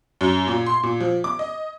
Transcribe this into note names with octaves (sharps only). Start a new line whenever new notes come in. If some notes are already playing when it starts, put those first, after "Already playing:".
F#2
A#2
C6
A#2
F3
D6
D#5